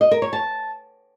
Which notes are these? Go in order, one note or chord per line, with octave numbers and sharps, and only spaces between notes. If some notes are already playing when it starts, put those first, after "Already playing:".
D#5
A#4
C#5
A5